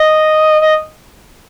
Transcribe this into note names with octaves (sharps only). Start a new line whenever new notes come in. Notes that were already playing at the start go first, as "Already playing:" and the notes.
Already playing: D#5
D#5